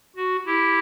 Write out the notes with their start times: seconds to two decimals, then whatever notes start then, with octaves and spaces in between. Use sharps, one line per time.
0.16 F#4
0.46 E4 G4